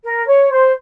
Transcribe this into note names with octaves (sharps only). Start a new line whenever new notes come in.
A#4
C#5
C5